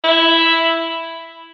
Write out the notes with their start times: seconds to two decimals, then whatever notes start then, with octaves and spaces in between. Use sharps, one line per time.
0.04 E4